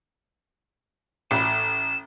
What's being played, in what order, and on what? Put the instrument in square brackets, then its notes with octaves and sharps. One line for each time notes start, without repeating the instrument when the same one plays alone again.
[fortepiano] A1 B5 [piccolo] E7